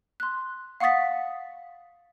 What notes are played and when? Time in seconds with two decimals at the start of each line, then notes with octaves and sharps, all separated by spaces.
0.20 C6 F#6
0.80 F5 F#5 C#6 D#6 A6 B6